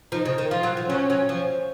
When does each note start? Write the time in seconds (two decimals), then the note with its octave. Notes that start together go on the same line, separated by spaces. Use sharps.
0.12 F3 D#4
0.25 C#3
0.38 D#3
0.51 F3 F4
0.63 F#3
0.77 F3
0.90 F#3 C#4
1.10 F#3
1.29 F3